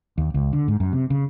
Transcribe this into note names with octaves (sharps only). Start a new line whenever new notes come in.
D#2
C#2
D3
G#2
F#2
C3
C#3